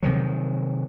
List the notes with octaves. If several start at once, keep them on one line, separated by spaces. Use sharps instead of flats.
C3 D#3 F3 F#3